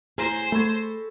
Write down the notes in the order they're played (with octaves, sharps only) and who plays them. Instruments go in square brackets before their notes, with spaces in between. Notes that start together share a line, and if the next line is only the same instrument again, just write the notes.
[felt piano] A2 A#5 A#6 [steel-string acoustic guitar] G#4 [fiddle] C5
[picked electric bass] A3 [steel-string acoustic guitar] A4 [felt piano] B5 C#6 G#6